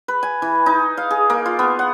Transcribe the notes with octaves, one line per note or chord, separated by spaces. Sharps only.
B4
G#5
E3
D#4
F5
G#4
A#3
F4
B3
F#5